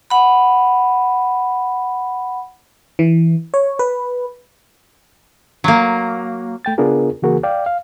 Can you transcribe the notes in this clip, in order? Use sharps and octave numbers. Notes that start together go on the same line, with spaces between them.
F#5 B5
E3
C#5
B4
F#3 A#3
A3 G5 A6
C#3 B3 D4 F4 G#4 A#4
C#3 E3 A#3 F#4 G#4 A#4
D5 F5 G5
F5